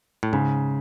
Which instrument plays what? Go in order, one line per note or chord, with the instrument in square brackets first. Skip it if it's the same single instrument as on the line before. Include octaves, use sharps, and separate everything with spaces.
[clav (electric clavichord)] A2
[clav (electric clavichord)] G#2 [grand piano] C#3